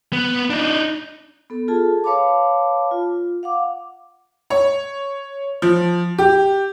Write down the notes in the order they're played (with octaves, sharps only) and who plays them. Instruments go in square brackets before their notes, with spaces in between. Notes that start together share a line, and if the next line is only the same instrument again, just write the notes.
[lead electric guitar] B3
D4 D#4
[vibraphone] B3 A4
F4 G#4 A4 A5
B4 C#5 F5 A5 B5 D6
F4
F5 F#5 D6
[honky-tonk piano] C#5
F3
G4